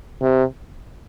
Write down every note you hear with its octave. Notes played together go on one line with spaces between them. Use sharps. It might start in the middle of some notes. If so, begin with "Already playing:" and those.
C3